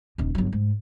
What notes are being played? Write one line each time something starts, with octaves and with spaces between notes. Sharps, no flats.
D#1 D#3
G1 F#3
G#2